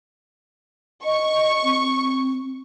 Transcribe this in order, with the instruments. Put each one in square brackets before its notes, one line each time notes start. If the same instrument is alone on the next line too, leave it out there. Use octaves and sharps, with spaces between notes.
[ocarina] D#5 [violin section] C#6
[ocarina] C4